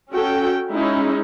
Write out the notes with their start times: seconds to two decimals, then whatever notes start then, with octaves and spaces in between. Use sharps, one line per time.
0.12 C#4 F#4 A4 G5
0.72 G#3 C#4 D#4 E4